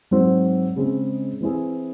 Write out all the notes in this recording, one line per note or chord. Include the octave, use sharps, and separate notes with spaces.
G#2 F#3 C4 F#4 C5
C#3 G#3 C4
E3 C4 E4 G#4